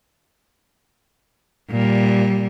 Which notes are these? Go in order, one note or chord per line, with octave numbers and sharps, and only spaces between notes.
A#2 G3